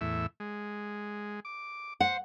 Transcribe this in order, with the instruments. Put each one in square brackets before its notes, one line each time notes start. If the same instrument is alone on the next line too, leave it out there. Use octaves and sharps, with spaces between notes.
[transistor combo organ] E2 A2 E5
G#3
D6
[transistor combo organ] C5 [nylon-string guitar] F#5